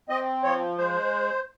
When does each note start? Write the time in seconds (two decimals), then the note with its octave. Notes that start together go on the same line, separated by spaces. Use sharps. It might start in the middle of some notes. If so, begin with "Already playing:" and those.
0.09 C4 D#5
0.43 F3 C#5
0.78 G#3 C5